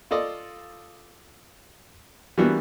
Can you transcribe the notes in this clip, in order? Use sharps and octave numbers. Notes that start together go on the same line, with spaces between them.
F4 A4 D5 D#5
E3 G3 A#3 B3 D4 F#4